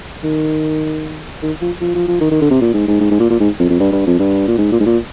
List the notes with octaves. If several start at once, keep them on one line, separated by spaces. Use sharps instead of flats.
D#3
D#3
F3
F3
F3
F3
D#3
D#3
D3
C3
A#2
G#2
G#2
G#2
G#2
A#2
A#2
G#2
F2
F2
G2
G2
F2
G2
A#2
G#2
A#2
G#2
A#2